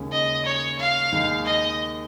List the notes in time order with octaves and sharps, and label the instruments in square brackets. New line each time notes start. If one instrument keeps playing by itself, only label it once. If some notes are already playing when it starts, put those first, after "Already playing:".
Already playing: [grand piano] D#2 C#3 G#3 C#4
[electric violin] D#5
C#5
F5
[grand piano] D#2 D#3 G#3 D#4
[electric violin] D#5